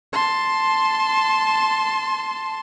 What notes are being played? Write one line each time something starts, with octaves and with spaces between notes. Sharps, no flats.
A5 C6